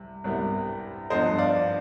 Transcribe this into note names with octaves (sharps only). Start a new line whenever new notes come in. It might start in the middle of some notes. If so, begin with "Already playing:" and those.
Already playing: C2 C3 G3
C2 C3 G3 B3
G2 F3 B3 C5 D#5
D5 F5